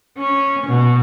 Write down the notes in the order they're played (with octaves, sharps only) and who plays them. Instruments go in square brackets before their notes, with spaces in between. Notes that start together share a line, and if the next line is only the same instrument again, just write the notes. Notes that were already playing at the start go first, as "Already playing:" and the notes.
[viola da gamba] C#4
B2